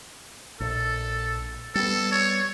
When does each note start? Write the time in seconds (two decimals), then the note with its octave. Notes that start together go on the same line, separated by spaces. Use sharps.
0.60 A#1 A4
1.75 G3 B3 A4
2.12 C#5